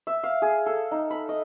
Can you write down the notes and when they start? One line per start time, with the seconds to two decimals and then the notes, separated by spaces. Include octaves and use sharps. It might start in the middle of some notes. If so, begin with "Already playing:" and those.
0.07 E5
0.23 F5
0.42 G#4
0.66 A4
0.91 D#4
1.11 B5
1.29 D#5